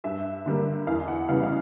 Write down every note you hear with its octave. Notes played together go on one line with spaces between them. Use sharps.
G2 E5
D3 G3 A#3
E2 F5
F#5
C#3 E3 G3 B3 F5
F5